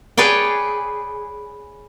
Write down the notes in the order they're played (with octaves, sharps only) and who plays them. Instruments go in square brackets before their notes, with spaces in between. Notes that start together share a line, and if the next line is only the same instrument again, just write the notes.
[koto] G#4 B4 C#5 D5 G5